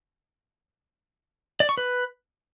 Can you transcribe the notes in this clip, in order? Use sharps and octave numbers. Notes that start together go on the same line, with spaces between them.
D5
C#6
B4